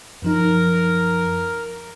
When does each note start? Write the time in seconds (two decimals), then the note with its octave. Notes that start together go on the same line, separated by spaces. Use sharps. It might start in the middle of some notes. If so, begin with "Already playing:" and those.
0.22 F#2 F3 D#4 A#4